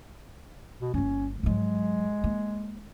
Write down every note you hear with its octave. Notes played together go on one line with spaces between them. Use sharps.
B2
G1 A#3 C#4
G#2 F#3 G#3
A#3